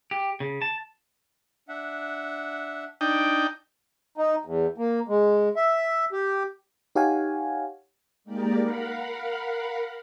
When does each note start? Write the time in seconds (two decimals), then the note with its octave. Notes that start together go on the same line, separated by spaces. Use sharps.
0.11 G4
0.40 C#3
0.62 A5
1.68 D4 E5 F#5
3.01 D4 D#4 G5
4.18 D#4
4.45 E2
4.78 A#3
5.09 G#3
5.56 E5
6.12 G4
6.95 D#4 G4 C#5 F5 F#5 G#5
8.24 G#3 A#3 D#4 G4 A#4 D5
8.62 A#4 F5 F#5 B5